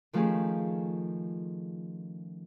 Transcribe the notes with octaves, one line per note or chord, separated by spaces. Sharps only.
D#3 F3 A3 C#4 G4 G#4